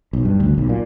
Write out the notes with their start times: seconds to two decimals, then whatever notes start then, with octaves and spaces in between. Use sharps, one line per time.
0.13 B1
0.25 G2
0.40 D2
0.58 B1
0.69 A#2